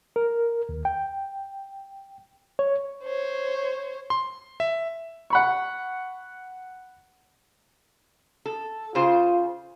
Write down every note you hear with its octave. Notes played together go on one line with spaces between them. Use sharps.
A#4
D#2
G5
C#5
C5 C#5
C6
E5
F#5 B5 C#6
A4
C#3 F4 G#4 C5